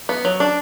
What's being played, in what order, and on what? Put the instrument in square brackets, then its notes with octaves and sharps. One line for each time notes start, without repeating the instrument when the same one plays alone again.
[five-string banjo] B3
F#3
D4